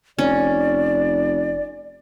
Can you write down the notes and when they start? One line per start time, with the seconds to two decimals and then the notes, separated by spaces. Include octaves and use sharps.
0.19 F1 C#4 D5